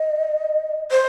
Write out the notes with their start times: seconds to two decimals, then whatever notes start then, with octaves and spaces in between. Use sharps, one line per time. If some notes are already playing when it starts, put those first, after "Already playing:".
Already playing: D#5
0.91 C5